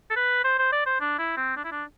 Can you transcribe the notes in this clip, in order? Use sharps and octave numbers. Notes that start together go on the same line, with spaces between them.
A4
B4
C5
C5
D5
C5
D4
E4
C4
D4
E4
D4